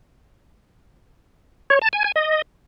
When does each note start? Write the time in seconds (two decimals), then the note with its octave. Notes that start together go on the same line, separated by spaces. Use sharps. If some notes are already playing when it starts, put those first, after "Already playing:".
1.70 C#5
1.82 A5
1.93 G#5
2.04 G#5
2.16 D#5